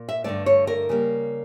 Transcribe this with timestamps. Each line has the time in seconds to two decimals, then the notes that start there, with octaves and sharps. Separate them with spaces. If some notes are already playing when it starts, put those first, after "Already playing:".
Already playing: A#2
0.09 E5
0.24 G2 D3 A3 D5
0.46 C#5
0.67 A#4
0.89 C#3 G3 A#3